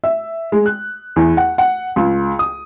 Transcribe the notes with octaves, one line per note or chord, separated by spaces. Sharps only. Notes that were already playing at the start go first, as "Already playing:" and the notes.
E5
G#3
F#6
E2
F#5
F#5
C#2
D#6